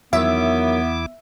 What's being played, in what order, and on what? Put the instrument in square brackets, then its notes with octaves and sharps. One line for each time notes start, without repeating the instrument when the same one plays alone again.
[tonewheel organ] E2 E4 D6 [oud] D#3 F#3 [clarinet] B3 [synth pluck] E5